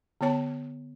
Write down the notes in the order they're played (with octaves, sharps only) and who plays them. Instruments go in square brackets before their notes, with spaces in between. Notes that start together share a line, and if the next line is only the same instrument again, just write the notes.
[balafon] D3 B3 C#5 A5